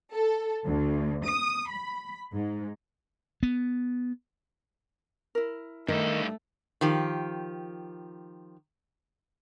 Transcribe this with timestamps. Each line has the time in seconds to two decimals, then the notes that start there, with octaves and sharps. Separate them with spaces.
0.13 A4
0.66 D2
1.25 D#6
1.69 B5
2.34 G#2
3.43 B3
5.35 E4 A#4
5.88 G2 D#3 A3 A4
6.81 D#3 F3 G4